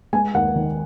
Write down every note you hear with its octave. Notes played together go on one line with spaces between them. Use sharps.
G#3 G#5
D#2 F#5
D#3